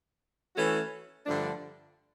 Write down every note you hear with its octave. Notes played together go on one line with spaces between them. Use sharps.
E3 A3 C#4 F#4 A4
G2 D3 F3 A3 D4